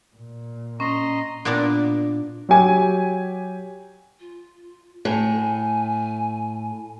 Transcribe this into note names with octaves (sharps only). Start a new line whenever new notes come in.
A#2
C#4 D#5 A#5 C6
A#2 A#3 B3 D4
F#3 G4 G#5
F4
A2 G#5